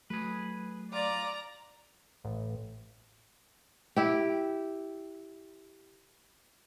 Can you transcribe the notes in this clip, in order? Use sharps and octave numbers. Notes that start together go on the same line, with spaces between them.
F#3 A3 G#4 B4
F4 D5 A#5
A1
E4 G4